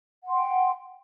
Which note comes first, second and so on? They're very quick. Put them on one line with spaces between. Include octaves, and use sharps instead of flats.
F#5 C6 G5